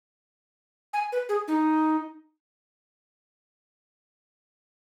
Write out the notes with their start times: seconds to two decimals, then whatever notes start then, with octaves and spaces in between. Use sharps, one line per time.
0.93 G#5
1.12 B4
1.29 G#4
1.48 D#4